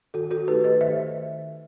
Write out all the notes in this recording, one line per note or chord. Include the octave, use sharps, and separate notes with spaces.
D#3 F#4 A4
F#4 A4
A3 D#4 G4 B4
B4 D#5
D#3 C5 E5